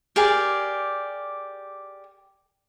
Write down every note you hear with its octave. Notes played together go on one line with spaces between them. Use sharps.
G4 G#4 A#4 D5